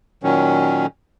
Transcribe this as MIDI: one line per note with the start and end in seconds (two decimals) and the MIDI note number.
0.23 0.86 46
0.23 0.86 51
0.23 0.86 54
0.23 0.86 61